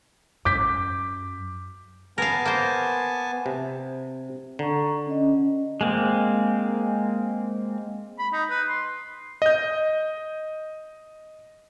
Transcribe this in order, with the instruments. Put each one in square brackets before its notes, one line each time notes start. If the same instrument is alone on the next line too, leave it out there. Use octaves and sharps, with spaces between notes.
[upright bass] F#2 [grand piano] D6 G6 B6
[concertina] B3 G#5 A5 [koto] A#4 F5
[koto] A#3 C5
[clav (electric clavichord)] C3
[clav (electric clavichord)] D3 [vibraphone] A#5 C#6
[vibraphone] C#4 D#5
[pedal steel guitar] G#3 A#3 C4
[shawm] B5
D#4
B4
C6
[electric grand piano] D#5 G6